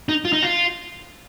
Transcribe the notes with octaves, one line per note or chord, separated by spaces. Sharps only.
D#4
F4
D#4
F4